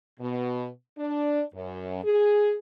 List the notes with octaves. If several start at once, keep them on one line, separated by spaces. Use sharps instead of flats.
B2
D4
F#2
G#4